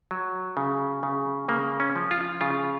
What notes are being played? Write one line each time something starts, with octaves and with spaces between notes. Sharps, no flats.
F#3
C#3
C#3
C#3 A#3
C#4
F3
F4
C#3 F4